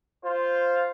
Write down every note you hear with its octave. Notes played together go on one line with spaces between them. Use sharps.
F4 C5